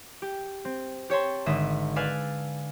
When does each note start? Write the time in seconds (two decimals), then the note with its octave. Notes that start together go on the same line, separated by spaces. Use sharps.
0.22 G4
0.65 C4
1.10 G4 C#5 A5 C6
1.46 G#1 D3 D#5 E5
1.96 A4 B4 D5 F5 G#5